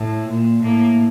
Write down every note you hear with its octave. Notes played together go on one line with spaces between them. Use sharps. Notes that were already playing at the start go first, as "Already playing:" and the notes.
Already playing: A2
A#2
A2 A#3